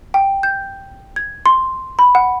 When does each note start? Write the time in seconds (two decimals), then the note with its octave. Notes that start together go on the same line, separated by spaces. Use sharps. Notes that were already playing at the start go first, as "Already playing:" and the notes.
0.14 G5
0.43 G6
1.16 G#6
1.46 C6
1.99 B5
2.15 F#5